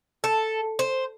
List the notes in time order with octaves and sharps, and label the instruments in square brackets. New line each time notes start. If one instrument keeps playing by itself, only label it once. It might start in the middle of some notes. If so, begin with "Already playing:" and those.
[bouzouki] A4
C5